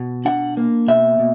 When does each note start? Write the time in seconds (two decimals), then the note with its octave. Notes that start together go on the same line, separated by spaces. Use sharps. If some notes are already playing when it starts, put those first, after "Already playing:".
Already playing: B2
0.25 D4 F#5
0.57 A#3
0.88 B2 E5
1.19 B2